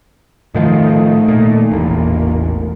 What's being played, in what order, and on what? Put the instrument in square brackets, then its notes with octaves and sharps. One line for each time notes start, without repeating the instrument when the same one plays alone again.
[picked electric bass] A2 D#3 F3 [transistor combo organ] A3 D#4
[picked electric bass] A#2
[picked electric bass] E1 A1 [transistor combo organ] A#3